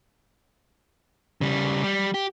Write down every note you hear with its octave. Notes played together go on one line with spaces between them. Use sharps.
C#3 G3
G3
G4